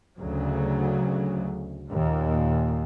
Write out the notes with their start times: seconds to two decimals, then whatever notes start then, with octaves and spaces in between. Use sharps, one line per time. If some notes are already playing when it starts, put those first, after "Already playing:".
0.18 D2 C#3 F#3
1.87 D#2 A#2